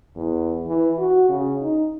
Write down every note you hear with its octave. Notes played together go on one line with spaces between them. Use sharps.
E2
E3
F#4
C#3
D#4